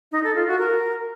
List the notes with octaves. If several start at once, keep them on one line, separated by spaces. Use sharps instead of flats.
D#4
A4
F4
F#4
A#4